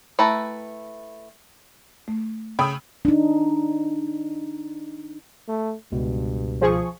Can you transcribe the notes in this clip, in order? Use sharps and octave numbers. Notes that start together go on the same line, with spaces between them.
A3 E4 B4 G5 A#5
A3
C#3 G5 B5 D#6 E6
D4 D#4
A3
C#2 G2 B2
F3 G#4 C#6